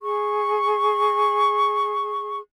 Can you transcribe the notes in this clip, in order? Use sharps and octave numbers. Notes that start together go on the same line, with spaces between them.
G#4 C#6